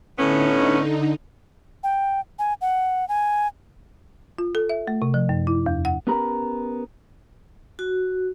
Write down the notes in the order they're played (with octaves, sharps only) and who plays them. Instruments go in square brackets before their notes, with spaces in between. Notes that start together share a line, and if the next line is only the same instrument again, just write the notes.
[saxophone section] A2 B3 C#4 [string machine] D3 D#4
[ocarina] G5
G#5
F#5
G#5
[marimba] F4
A4
E5
A3
C3
F3
F#2
E4
E2
F#5
[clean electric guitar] B3 C#4 G4 A#4 A#5 B5
[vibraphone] F#4